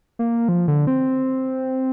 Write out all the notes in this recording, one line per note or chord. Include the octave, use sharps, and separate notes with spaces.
A#3
F3
D3
C4